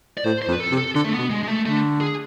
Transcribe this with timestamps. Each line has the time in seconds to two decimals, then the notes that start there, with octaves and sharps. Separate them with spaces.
0.17 D5
0.24 A2 C5
0.42 C5
0.48 F2
0.52 B4
0.60 A4
0.71 C3
0.77 A4
0.95 D3 A4
1.04 A3
1.13 B3
1.18 B2
1.30 G#3
1.43 G#3
1.48 A3
1.66 D3 A3
2.01 G#4